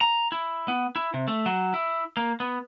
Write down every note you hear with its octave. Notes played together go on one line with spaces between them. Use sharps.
A#5
E4
B3
E4
C3
A3
F#3
E4
A#3
B3